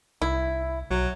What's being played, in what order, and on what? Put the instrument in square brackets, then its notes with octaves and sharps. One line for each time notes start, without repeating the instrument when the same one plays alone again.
[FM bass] C2 [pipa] E4
[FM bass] B1 [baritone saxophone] F#3